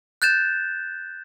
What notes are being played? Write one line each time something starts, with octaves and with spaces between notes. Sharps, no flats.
F#6 G6 A6 E7